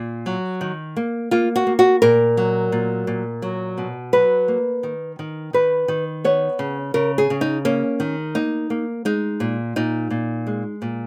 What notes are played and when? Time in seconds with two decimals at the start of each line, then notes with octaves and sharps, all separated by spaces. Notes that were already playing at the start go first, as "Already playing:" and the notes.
Already playing: A#2
0.26 F#3
0.61 D#3
0.96 A#3
1.31 A#3 F4
1.56 F#4
1.67 A#3
1.79 F#4
2.02 A#2 A#4
2.37 F#3
2.72 A#2
3.07 A#2
3.42 F#3
3.78 B2
4.13 F#3 B4
4.48 A#3
4.83 D#3
5.19 D#3
5.53 D#3 B4
5.88 D#3
6.24 B3 C#5
6.59 C#3
6.94 C#3 A#4
7.18 G#4
7.30 C#3
7.41 D#4
7.65 A#3 C#4
8.00 D#3
8.35 A#3 D#4
8.70 A#3
9.05 G#3 D#4
9.40 A#2
9.76 A#2 D#4
10.10 A#2
10.47 G#3
10.82 A#2